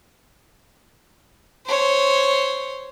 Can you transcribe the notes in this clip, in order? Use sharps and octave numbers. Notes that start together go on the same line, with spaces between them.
C5 C#5